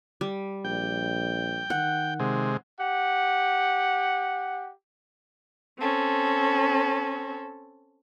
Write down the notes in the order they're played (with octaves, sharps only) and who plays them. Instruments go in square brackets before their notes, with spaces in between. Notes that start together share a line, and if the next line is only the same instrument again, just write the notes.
[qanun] G3
[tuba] A#1 [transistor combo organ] G5
[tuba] D#3 [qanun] F#5
[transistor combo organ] C3 G#3
[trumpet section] G4 F#5
[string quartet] C4 C#4 A4